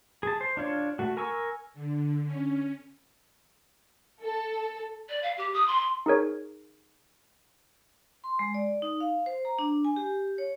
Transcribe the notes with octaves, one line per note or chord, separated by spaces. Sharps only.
G#4 A5
C5
D4 F4 C#5
A3 F#4
A#4 G#5 C#6 E6
D3
C#4
A4
D5
F5
G4
D#6
C6
D#4 G#4 A#4 C#5
C6
G#3
D5
D#4
F5
C5
A#5
D4
G#5
G4
C#5